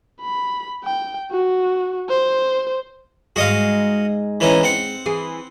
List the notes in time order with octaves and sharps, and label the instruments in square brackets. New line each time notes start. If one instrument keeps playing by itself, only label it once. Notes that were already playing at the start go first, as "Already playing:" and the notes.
[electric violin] B5
G5
F#4
C5
[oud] G#2 G#3 [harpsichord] F#4 D#5 F5
[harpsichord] E3 C#4 D#4
C4 F#5
[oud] E3 G#4